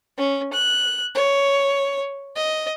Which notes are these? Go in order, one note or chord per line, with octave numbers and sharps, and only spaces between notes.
C#4
F#6
C#5
D#5